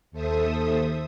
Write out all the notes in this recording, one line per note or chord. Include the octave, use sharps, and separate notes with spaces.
D#2 A4 C5 E5 D#6